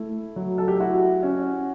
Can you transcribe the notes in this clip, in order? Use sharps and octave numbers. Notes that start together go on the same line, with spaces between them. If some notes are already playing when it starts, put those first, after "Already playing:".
Already playing: A3 E4
F#3
A4
G4
E4 F#4
C#4